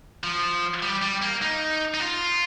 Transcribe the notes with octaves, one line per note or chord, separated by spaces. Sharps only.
F3
G3
G3
A#3
D#4
D#4
F4